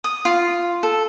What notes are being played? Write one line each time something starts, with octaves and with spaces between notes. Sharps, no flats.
D#6
F4
A4